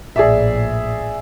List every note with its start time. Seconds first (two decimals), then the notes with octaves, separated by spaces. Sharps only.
0.16 A#1 A2 G#4 D5 E5